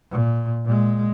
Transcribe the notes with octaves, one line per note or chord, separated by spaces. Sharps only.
A#2
A#2 G#3